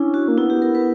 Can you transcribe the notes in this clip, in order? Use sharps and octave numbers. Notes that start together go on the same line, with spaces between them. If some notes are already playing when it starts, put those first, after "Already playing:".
Already playing: C#4 D4 E4
F#4
A#3
B3 E4
G4
A#4
B4